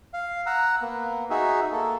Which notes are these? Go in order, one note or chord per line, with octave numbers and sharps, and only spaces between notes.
F5
F#5 A#5 E6 F#6
A#3 B3
D#4 F#4 G#4 E5
A#3 A4